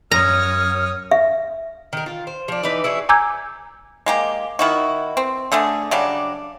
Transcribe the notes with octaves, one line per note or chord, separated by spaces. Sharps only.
F#2 C#5 A#5 D#6 F6
E5
D#3 A#4
F4
C5
F3 D4
E3 D#4 B4 D5
E4 F#4 G#4
G#5 A#5 D6 E6 G6 G#6
G#3 A#3 G4
D#3 E4 F#4
C4
D3 A3 D4 G#4
C#3 F#3 G3 D4